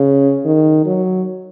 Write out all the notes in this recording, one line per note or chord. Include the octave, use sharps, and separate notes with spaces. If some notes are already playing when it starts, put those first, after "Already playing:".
Already playing: C#3
D#3
F#3